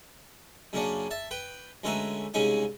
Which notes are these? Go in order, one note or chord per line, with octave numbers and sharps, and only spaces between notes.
F#2 C#3 A#3 C#4 D4
E5 A5
B4 G5
D2 G#3 C#4 B4 E5 A#5
C2 C#3 G#3 C#4 D#4 G#5